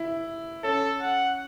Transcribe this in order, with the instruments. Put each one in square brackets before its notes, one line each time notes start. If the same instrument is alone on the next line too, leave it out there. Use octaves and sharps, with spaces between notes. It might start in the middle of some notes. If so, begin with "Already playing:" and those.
Already playing: [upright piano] E4
[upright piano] C#4 [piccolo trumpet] A4
[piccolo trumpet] F#5